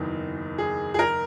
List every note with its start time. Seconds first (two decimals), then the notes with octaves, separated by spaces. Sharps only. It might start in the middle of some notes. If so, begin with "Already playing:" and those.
Already playing: F#1 E2 D#3
0.58 G#4
0.94 G#4
0.99 A#4